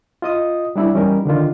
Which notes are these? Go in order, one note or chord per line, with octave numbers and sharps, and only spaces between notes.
F4 D#5 D#6
G3 D4 E4 G4 D5
E3 G3 C#4 D#4 A#4
D3 D#3 D4 F4